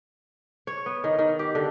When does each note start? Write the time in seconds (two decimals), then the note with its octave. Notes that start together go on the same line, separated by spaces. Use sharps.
0.67 C#5
0.86 B3
1.04 D#3
1.19 D#3
1.39 G4
1.55 D3